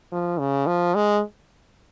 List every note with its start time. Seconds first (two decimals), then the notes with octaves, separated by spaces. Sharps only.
0.12 F3
0.39 C#3
0.67 F3
0.95 G#3